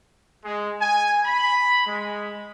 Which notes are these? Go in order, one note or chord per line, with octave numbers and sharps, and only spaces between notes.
G#3
G#5
B5
G#3